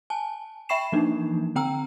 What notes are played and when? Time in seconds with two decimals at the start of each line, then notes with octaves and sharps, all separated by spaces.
0.10 G#5 A5
0.69 E5 G5 B5 C#6 C7 E7
0.92 E3 F3 A#3 D4 D#4
1.55 D3 C4 G5 A#5 E6